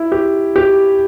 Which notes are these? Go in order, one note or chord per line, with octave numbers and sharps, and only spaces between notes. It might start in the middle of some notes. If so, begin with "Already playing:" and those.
Already playing: E4
G4
G4